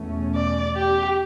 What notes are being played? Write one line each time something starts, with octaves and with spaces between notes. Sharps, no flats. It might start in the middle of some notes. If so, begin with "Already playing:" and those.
Already playing: E2 B2 A3 C#4
D5
G4